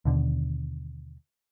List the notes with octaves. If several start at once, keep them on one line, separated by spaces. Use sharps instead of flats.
D#2 B2 D3